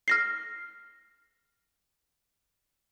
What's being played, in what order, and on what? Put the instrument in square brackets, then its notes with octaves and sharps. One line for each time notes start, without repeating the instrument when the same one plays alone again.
[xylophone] F6 A#6 C7